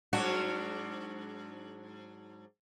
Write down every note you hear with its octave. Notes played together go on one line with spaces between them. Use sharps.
G#2 F#3 D4 F#4